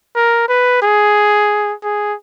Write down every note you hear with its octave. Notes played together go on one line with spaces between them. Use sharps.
A#4
B4
G#4
G#4